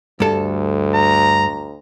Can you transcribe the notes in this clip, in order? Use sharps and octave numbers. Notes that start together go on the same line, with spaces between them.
D2 G2 A4
A#5